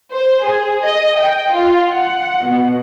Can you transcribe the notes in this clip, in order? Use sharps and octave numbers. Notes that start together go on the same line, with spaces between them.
C5
G#4
D#5
G5
F4
F#5
B2